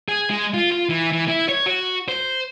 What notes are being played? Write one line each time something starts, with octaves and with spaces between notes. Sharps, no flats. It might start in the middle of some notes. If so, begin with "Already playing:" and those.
G#4
G#3
F4
F4
E3
E3
E4
C#5
F#4
C5